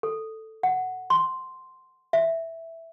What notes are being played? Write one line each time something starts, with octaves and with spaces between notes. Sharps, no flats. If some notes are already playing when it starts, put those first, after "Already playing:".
A4
F#5
C6
E5